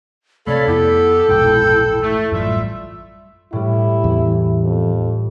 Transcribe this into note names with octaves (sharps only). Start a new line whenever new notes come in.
C3 A3 A4 C#5 D5 F5 B5
F2 B3 E4 G4
E1 A#1 G#2 G5
A3
A1 F#2 G3 F4 E5
A2 G3 E4
E2
F2